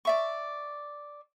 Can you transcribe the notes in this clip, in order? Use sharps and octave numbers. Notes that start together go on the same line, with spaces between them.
D5 E5 C#6